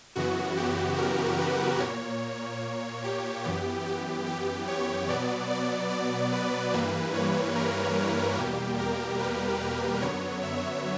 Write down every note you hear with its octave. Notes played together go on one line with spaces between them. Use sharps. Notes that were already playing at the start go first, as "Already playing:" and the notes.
F#2 C#3 E3 B3 F#4
G4
A#4
B4
A#2 A#3 C#5
G4
F#2 E3 B3 G4
G4
G4
C#5
B2 F#3 B3 D5
D5
D5
B4
G2 E3 G3 A#3 B4
C#5
A#4
E2 B2 G3 A#3 G4
A#4
B4
B4
F#2 D3 F#3 B3 C#5
E5